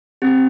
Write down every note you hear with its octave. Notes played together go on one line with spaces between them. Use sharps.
C4 G4